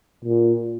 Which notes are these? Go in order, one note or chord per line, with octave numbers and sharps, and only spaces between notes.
A#2